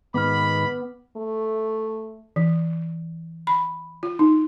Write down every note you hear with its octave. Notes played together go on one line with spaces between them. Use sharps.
G#2 D#3 B3 B5 D6 F6
A3
E3
B5
F4
D#4